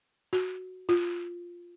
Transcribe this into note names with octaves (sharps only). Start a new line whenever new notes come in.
F#4
F4